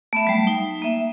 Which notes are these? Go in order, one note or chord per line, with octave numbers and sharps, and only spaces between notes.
A3 B3 E5
F#3 G3
D#4
A#3 E5